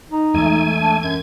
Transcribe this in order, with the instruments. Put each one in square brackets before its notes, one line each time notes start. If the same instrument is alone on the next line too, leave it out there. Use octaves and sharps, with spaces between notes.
[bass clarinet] D#4
[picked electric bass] E2 G#3 [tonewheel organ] A3 G#5
[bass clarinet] D4
[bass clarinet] F#2 [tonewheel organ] G#6